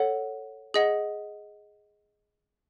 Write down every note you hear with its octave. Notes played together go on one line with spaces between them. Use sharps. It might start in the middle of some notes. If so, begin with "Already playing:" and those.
Already playing: A4 C#5 F#5
G#4 D#5 F#5